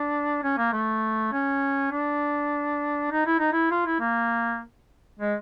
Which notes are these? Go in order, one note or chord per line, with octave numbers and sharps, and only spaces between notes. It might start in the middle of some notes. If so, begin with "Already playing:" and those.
Already playing: D4
C#4
A#3
A3
C#4
D4
D#4
E4
D#4
E4
F4
E4
A#3
G#3